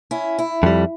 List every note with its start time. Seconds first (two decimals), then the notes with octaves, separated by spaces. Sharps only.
0.11 C#4 E4
0.39 E4
0.63 F2 G3